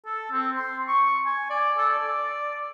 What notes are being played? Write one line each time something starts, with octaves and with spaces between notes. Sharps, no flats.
A4
C4
C6
C#6
G#5
D5
A4
D5